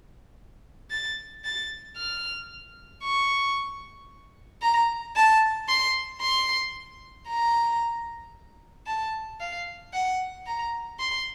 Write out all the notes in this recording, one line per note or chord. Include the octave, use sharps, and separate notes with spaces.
A6
A6
F6
C#6
A#5
A5
C6
C6
A#5
A5
F5
F#5
A#5
C6